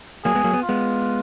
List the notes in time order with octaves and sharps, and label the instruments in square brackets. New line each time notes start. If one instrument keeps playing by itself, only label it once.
[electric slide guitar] F#3 A#3 [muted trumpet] G#4
[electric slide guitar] G#3 B3
F#3 A#3
B3
[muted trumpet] F4
[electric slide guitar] G#3 B3